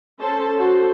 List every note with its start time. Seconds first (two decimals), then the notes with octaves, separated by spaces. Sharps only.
0.21 C#4 A4 C5 A5
0.58 F#4 A4 C5